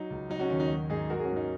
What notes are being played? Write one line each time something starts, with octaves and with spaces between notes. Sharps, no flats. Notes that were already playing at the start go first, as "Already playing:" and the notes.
Already playing: F#3 D#4
C#2
F#3 D#4
C#4 F#4
D#2 C#4
D#4
F#3
G#2 D#4 G#4
F#3 F#4 A#4
G#4
C#4 F#4
G#2
D#4